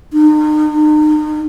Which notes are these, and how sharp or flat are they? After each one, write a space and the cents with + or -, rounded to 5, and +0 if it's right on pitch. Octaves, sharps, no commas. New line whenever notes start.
D#4 -40